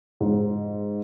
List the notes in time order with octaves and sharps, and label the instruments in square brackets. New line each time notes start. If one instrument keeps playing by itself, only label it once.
[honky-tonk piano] G#2